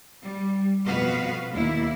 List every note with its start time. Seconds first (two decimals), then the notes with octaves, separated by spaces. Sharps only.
0.23 G3
0.86 F2 B2 B3 F#4 B4 F5
1.51 D#2 A#3 E4